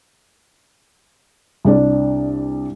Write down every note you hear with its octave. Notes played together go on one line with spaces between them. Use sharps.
C2 D4 D5